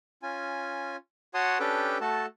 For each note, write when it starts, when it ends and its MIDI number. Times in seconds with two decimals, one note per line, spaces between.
0.23 0.96 61
0.23 0.96 65
0.23 0.96 80
1.34 1.58 66
1.34 1.58 73
1.34 1.58 78
1.34 1.58 81
1.34 1.58 84
1.34 1.58 87
1.60 1.98 61
1.60 1.98 62
1.60 1.98 67
1.60 1.98 69
1.60 1.98 71
1.60 1.98 79
2.01 2.26 57
2.01 2.26 66
2.01 2.26 69
2.01 2.26 81